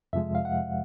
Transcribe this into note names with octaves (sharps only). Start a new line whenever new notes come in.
F2 C3 F3 G#3 E5
F5
F#5